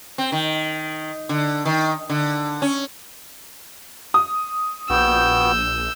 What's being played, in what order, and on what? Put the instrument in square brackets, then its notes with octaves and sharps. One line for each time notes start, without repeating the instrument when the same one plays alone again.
[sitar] C4
D#3
D3
D#3
D3
C#4
[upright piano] D#6
[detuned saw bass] A#1 [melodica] B3 F#4 G5 [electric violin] E6 G6